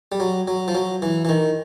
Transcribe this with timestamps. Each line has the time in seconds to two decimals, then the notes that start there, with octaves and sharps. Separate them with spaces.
0.12 G3
0.20 F#3
0.48 F#3
0.68 F3
0.75 F#3
1.02 E3
1.25 E3
1.29 D#3